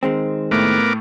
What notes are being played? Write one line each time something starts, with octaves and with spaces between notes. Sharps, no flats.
D#3 G#3 C4
A2 A3 B3 A#4 D6